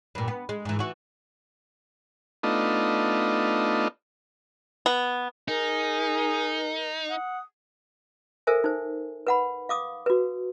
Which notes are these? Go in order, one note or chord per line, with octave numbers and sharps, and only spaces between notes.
G2 A#2
B3
G#3
G#2 E3
E3 F#4
A3 B3 D4 D#4 F4 D#5
B3
D#4 G#4 A#4
F#5 D#6
A4 A#4 C5 E5 G#5
D#4 C5
B4 F#5 B5
F5 D6 D#6
F#4 B4